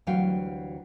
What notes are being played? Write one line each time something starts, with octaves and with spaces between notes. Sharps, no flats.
D2 E3 F#3 G3 F5 G5